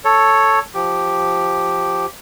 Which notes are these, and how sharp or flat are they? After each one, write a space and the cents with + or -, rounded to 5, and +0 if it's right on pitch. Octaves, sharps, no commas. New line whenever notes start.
A4 +0 C#5 +0
F3 +0 G4 +0